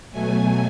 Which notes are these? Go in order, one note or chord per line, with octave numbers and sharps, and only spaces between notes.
B2 F#3 A3 G#5